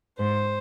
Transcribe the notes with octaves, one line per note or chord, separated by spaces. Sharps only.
G#2 C5